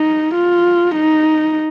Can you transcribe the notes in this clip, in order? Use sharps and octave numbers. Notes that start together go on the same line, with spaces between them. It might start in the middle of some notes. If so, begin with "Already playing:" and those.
Already playing: D#4
F4
D#4